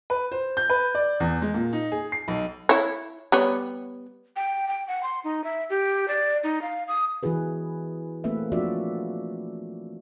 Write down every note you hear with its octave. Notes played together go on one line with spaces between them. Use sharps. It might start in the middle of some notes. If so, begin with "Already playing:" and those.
B4
C5
G6
B4
D5
E2
G#3
A#2
D#4
G#4
C7
B1
E4 C#5
G3 B3 C#5
G5
G5
F#5
C6
D#4
E5
G4
D5
D#4
F5
D#6
E3 E4 F#4 G#4 B4
A3 A#3 C4 B4 E5
F3 D4 F4 F#4 D5 E5